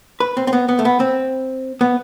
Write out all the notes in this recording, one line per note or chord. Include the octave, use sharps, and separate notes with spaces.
B4
C4
C4
B3
B3
A3
B3
C4
B3